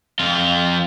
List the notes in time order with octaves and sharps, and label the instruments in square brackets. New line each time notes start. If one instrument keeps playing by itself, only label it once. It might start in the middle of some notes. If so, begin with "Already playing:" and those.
[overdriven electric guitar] F2 F4